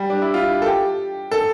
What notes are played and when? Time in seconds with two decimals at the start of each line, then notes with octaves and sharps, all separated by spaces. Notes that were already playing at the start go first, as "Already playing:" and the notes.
Already playing: G3
0.10 D4
0.22 E4
0.34 F4
0.62 A4
0.66 G4
1.31 A4